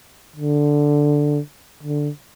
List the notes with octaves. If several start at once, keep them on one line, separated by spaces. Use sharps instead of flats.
D3
D3